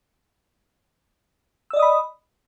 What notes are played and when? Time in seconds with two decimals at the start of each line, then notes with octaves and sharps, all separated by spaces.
1.70 E6
1.73 D5
1.76 D#5
1.79 D#6
1.82 B5